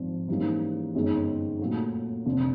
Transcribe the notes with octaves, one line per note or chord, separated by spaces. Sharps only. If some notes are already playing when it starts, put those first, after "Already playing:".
Already playing: G#1 G#2 F3
G#2 E3 G3 A#3 C#4
G1 F#2 D#3 G#3 C#4
A#2 F#3 A3
F1 F2 D3